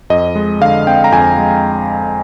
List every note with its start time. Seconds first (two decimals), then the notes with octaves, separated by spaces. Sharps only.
0.10 F2 D#5
0.36 G#3
0.61 D3 F5
0.87 C4 G5
1.04 A#5
1.12 F2 G#5
1.38 G#3